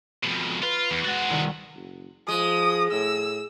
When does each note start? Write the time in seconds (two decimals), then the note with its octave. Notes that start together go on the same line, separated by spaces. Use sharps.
0.24 F2 B2
0.63 F4 B4
0.91 E2
1.05 G#3 F#4 F#5 A6
1.30 C2 D#3 E4
1.75 F#1
2.28 F3 G#3 D#6
2.92 A2 E6